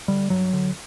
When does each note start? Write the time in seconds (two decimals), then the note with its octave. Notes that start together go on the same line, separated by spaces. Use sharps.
0.08 D3 G3
0.30 G2 F#3
0.53 D3